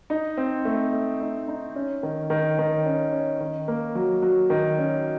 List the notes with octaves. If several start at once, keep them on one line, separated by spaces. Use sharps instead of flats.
D#4
C4
A3
A3
D#4
D#4
C#4
D#3
D#3
D#3
C#4
C#4
D#3
A#3
F#3
F#3
D#3
C#4